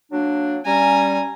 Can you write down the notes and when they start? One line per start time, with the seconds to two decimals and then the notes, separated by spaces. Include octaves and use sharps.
0.12 F#3 A#3 D4
0.66 G3 C#4 G#5 A#5